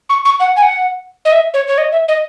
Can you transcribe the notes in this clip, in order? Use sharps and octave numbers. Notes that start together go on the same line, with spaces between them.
C#6
C#6
F#5
G#5
F#5
D#5
E5
C#5
C#5
D#5
E5
D#5